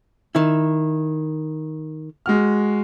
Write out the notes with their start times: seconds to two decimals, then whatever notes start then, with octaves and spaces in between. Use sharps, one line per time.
0.35 D#3 E4
2.26 G#3 F#4 F6